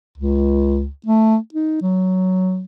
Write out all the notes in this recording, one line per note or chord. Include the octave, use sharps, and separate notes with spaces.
C#2
A3
D#4
F#3